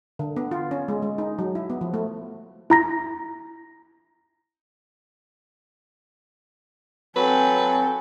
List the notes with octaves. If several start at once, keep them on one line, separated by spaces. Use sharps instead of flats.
D3
B3
F4
C#4
G#3
G#3
D#4
F#3
E4
B3
F3
A3
E4 A#5 A#6
F#3 C4 A4 B4 G5 G#5